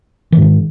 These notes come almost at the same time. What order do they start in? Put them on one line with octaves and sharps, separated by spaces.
E3 G#2 D#3